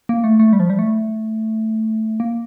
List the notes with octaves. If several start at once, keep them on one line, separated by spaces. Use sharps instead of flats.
A#3
A3
A3
G3
F3
G3
A3
A#3